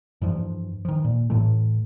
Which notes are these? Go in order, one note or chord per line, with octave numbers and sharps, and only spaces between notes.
G2 E3 F3
D#3 F3
A#2
A2 E3 A3